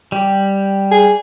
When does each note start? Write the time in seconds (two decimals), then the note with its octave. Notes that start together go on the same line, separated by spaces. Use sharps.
0.12 G3 G4
0.91 G#4